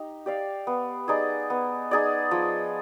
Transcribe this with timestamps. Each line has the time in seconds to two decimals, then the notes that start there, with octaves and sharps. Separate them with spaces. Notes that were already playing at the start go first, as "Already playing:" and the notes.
Already playing: D#4 G4
0.26 G4 D5 F5
0.67 B3
1.08 D#4 G#4 D5
1.50 B3
1.91 D#4 G#4 D5
2.31 F3